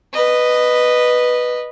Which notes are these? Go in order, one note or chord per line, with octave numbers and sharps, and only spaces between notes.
B4 D#5